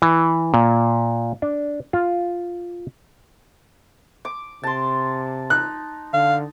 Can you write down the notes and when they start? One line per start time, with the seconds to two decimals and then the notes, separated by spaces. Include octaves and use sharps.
0.02 E3
0.54 A#2
1.42 D4
1.93 F4
4.25 D6
4.63 C3 A5 C6
5.50 D#4 F#6
6.13 D3 F5